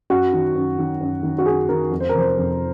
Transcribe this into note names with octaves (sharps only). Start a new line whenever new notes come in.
F#2 F#4
D#3
F#2
D#3
F#2
D#3
F#4
F#2 G#4
D#3 A#4
F2
C5
A#4
C3 F3 C5
F2